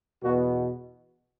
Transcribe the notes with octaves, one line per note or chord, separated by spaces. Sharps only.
E2 B2 B3 F#4